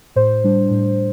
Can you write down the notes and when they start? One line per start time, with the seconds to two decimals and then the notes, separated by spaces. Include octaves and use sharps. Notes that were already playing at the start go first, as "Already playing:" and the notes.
0.16 A2 C5
0.44 G3 D4
0.71 A2